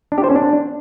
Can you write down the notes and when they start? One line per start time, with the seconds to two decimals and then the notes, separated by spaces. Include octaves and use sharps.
0.12 D4
0.18 G4
0.24 C5
0.30 C#4
0.36 D4